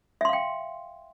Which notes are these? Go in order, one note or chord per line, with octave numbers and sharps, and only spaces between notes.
E5 F5 G5 C6